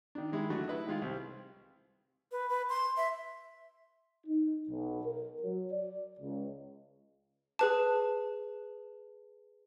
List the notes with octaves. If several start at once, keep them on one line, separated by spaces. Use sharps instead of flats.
D#3 D4
D#3 G#3 E4
D3 F#3 A3 F#4
E4 B4 D#5
D#3 G#3 F4
C2 C4
B4
B4
C6
E5
D#4
B1
A#4
F#3
D5
C#2
G#4 B4 A5